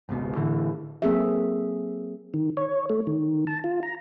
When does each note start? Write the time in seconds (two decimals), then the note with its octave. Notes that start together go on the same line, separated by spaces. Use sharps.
0.09 G#1 C#2 B2
0.35 A2 D3 E3
1.02 F#3 A#3 C4 G#4 A4 E5
2.34 D#3
2.57 C#5
2.90 A3
3.07 D#3
3.47 A5
3.64 F4
3.83 A#5